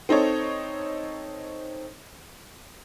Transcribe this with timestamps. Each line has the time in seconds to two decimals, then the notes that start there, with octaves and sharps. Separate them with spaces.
0.09 C4 D#4 A4 C#5